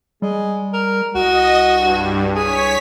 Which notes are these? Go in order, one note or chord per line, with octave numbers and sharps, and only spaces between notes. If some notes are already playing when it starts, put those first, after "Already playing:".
G3 G#3
A#4
C2 F#4 D#5
G2
G#4 C#5 B6